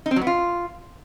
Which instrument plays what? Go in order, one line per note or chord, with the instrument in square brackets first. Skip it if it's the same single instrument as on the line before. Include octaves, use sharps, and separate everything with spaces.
[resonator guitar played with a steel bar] D#4
C4
F#3
B3
F4